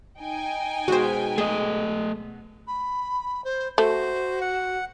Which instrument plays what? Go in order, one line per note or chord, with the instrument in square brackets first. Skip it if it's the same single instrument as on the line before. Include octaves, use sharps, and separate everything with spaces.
[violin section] D#4 G5 G#5
[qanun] B2 G#3 [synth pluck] F#4 C5
[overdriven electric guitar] A3 D#5 [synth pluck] G#4
[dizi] B5
C5
[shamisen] A3 [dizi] F#4 [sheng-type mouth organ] C5
[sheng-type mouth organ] F#5